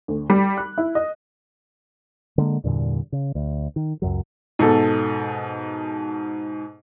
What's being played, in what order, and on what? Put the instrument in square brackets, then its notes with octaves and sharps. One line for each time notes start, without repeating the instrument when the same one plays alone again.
[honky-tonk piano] D2
G3
F#6
E4
D#5
[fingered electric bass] D3 G#3 A#3
E2 G2 A#2 D3
C#3
D2
D#3
C#2 F#2 F#3
[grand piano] G#2 B2 A4